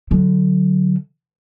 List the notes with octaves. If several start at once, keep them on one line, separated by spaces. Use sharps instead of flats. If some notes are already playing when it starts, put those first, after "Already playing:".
D3 F#3